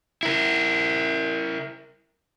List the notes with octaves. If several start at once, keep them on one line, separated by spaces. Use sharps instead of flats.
E4 A#4